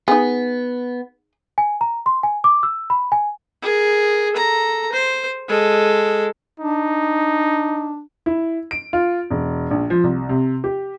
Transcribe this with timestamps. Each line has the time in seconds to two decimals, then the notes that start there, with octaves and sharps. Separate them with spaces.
0.08 B3 D#4 G#4
1.58 G#5
1.81 A#5
2.06 C6
2.23 G#5
2.44 D6
2.63 E6
2.90 B5
3.12 G#5
3.62 G#4 A#4
4.32 A4 A#5
4.93 C5
5.48 G#3 A4
6.60 D4 D#4
8.26 E4
8.71 D7
8.93 F4
9.31 E1
9.71 A#1
9.90 F3
10.04 C2
10.29 C3
10.64 G4